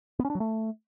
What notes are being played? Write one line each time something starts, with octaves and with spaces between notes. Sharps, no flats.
B3
C#4
D4
F#3
A3